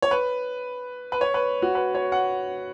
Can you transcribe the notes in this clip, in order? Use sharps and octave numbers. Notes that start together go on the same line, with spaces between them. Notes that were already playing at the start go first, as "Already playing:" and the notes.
C#5
B4
B4
C#5
B4
F#4
B4
C#5
F#5